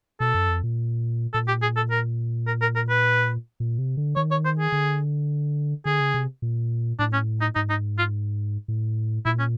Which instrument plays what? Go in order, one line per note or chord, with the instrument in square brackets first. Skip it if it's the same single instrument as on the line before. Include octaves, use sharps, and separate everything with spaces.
[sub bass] B2 [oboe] A4
[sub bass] F#2
F2
A#2
[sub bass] A#2 [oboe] A4
[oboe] G4
G#4
A4
A#4
A#4
A#4
A#4
B4
[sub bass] A#2
C3
D3
[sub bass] D#3 [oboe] C#5
[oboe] C#5
C5
G#4
[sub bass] D3
[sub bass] D3 [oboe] G#4
[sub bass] C#3
C3
A#2
[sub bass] A2 [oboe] D4
[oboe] C#4
D#4
[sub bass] G#2 [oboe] D#4
[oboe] D#4
F4
[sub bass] A2
[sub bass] A#2 [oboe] E4
[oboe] C#4